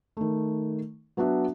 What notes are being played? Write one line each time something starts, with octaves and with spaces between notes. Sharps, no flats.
D#3 A3
F#3 B3 D4 F#4 E5